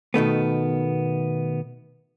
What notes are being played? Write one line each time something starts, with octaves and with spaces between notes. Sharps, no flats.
B2 D#3 A3 B3